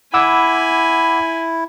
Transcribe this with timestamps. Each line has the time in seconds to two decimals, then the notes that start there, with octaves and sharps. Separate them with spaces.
0.14 E4 F#5 G#5 B5 D6 E6